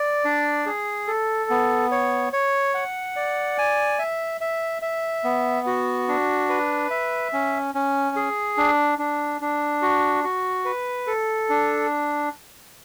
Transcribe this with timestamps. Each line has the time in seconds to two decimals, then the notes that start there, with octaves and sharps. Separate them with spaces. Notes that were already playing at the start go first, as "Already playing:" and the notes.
Already playing: D5
0.25 D4
0.66 G#4
1.07 A4
1.50 B3
1.91 C#5
2.33 C#5
2.74 F#5
3.16 D5
3.58 G#5
3.99 E5
4.41 E5
4.82 E5
5.24 B3
5.67 F#4
6.08 D4
6.49 B4
6.91 E5
7.33 C#4
7.75 C#4
8.16 G#4
8.57 D4
8.99 D4
9.41 D4
9.82 F#4
10.24 F#4
10.65 B4
11.07 A4
11.50 D4